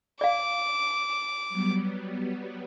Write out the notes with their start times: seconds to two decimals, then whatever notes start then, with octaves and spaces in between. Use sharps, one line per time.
0.21 D5 F5 D6
1.49 F#3 G3 B3